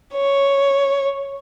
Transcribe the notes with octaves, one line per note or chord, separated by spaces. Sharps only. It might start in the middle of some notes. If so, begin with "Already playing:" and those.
C#5